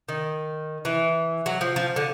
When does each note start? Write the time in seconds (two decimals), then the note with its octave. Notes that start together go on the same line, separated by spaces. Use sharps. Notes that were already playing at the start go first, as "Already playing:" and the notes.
0.09 D#3
0.85 E3
1.46 F#3
1.61 F3
1.76 F3
1.96 D3